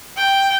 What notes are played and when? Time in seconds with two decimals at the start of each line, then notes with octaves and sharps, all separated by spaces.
0.17 G5